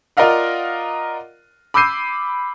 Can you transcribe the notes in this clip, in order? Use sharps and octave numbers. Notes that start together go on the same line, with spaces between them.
F4 A#4 D5 D#5 F5 F#5
B5 D6 E6 G6 C7 D#7